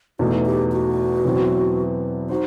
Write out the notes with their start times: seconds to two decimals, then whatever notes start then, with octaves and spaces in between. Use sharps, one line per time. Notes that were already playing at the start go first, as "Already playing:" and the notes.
0.19 E2 B2 A3 D#4 F#4
0.46 G4
0.72 F#4
1.25 E2 B2 F#3 C4 E4
2.29 D#4 F#4 C5